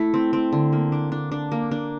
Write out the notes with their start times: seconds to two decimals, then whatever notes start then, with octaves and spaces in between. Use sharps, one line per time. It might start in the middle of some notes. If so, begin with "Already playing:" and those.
Already playing: A3 E4
0.14 C4
0.33 C4
0.53 D3
0.72 A#3
0.92 D4
1.12 D4
1.32 D4
1.52 A#3
1.71 D4